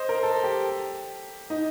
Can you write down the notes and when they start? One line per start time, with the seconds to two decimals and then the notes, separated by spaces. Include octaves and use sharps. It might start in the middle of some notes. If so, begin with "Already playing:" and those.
Already playing: C5 D#5
0.09 A#4
0.23 A4
0.44 G4
1.50 D#4